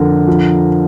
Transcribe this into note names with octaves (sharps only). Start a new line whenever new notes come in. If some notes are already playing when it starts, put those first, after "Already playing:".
Already playing: F2 D3 A#4
F3